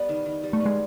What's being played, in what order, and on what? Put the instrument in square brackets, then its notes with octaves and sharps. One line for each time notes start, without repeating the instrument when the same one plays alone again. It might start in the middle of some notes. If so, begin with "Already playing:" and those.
Already playing: [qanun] G3 B3
D#3
D#3
G3
[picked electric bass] A3
[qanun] B3
[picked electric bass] G#3